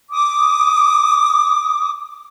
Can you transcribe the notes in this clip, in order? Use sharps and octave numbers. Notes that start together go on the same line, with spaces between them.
D6 D#6